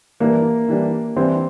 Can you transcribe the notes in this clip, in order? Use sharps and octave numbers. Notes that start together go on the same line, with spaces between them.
E3 G3 A#3 D4
E3 G3 D4
E3 G3 C4 D4